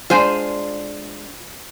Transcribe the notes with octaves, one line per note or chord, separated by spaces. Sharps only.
G#3 D4 F4 C5 G#5